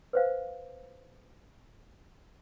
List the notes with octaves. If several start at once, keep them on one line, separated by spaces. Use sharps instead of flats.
B4 C5 F5